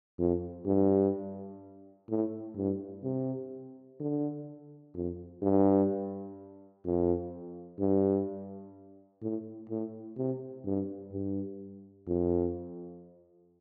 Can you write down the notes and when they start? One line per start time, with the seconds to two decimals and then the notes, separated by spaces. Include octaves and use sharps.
0.18 F2
0.66 G2
2.09 A2
2.56 G2
3.03 C3
4.00 D3
4.94 F2
5.42 G2
6.85 F2
7.79 G2
9.22 A2
9.69 A2
10.17 C3
10.65 G2
11.12 G2
12.07 F2